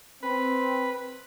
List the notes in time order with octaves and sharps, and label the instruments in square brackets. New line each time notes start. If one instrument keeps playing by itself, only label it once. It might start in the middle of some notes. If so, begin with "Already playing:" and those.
[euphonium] C4 [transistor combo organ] B4